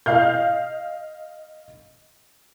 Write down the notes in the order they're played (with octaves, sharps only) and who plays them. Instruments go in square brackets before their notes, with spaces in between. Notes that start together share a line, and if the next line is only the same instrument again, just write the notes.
[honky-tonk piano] D#5 F5 F6 G6